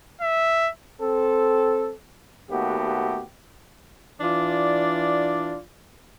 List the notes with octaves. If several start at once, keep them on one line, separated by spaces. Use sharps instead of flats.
E5
C4 A4
D#2 A3 B3 F#4 G4
E3 D4 F4 D5